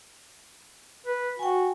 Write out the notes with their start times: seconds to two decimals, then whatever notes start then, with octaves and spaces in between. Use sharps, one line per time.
1.07 B4
1.39 F#4 G5 G#5